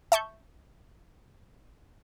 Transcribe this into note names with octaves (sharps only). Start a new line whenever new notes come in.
E5 A5 C#6 G6